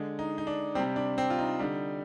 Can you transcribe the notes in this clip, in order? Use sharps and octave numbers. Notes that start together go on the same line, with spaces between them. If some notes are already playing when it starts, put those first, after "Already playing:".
Already playing: D3 G#3
D#4
D#4
D4
C3 G3 C4
D4
C4
F4
D#4
D3 G3